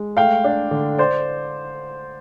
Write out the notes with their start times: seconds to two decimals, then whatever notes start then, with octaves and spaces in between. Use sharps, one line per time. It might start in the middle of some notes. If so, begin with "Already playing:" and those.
Already playing: G#3
0.17 A3 F5 G5
0.44 D4
0.71 D3
0.98 C5 D5